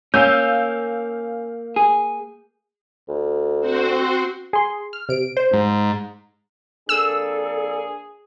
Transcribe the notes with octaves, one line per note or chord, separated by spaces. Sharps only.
A#3 C#4 F5 E6 G6
G#4
D2
C4 F#4 C5
G#4 C6
F6
C3 D7
C5
G#2
F2 A#3 D4 G#4 A4 E6